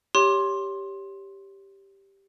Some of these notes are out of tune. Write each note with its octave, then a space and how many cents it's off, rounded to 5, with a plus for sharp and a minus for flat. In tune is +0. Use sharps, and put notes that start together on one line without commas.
G4 +0 C#5 +15 C6 +15